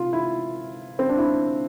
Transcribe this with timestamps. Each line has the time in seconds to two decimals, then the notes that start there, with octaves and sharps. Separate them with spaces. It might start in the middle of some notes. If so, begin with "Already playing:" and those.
Already playing: C3 F4
0.13 E4
0.99 C4
1.09 D4
1.18 E4